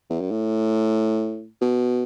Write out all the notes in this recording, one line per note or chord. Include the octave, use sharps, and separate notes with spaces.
E2
F#2
A2
B2